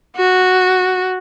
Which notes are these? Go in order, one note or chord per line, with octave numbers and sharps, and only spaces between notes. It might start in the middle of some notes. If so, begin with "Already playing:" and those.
F#4